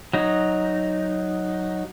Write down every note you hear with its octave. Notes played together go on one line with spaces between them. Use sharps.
F#3 D#4